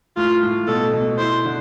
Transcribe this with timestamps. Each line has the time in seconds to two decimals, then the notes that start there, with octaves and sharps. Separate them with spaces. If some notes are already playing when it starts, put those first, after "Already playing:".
0.17 A2 F4
0.43 A2
0.68 B2 A4
0.94 B2
1.19 E4 C5
1.45 D3